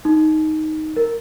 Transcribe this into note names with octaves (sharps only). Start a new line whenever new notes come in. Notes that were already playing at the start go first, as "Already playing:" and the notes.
D#4
A#4